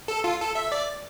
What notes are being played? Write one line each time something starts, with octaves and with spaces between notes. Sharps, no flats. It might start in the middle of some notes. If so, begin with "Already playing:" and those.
A4
F4
A4
E5
D5